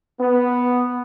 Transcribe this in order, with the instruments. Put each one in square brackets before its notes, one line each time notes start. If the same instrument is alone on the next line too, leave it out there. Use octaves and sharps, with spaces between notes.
[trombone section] B3